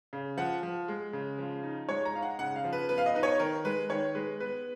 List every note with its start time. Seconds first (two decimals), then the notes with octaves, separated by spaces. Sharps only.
0.13 C#3
0.37 F3 F#5
0.63 F3
0.88 G#3
1.13 C#3
1.38 F3
1.63 D#4
1.88 G#3 C#5
2.05 A#5
2.14 D#4 F5
2.22 F#5
2.39 C#3 F#5
2.56 F5
2.64 F3
2.73 B4
2.89 B3 B4
2.98 F5
3.06 D#5
3.15 D#4 B4
3.23 C#5
3.40 D#3 A#4
3.65 G#3 B4
3.90 D#3 C#5
4.15 G#3 B4
4.40 B3 B4